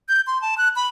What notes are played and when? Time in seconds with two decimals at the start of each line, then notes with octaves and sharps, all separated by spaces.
0.09 G6
0.27 C6
0.42 A5
0.58 F#6
0.76 B5